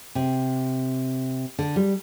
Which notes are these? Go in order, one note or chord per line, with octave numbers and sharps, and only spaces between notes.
C3
D3
G3